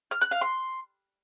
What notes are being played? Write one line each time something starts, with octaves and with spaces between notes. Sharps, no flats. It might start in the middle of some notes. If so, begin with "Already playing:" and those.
F6
F#6
F5
C6